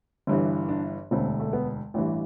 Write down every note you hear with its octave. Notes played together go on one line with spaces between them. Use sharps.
G1 G2 E3
D4
E1 D2 D3 C4
A3
B3
A1 G2 E3